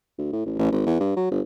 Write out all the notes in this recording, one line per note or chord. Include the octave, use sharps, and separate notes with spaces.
D2
A2
A1
A1
G#1
E2
G2
F#3
G1